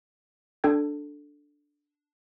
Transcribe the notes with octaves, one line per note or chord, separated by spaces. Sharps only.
D4 A4 G5 G#6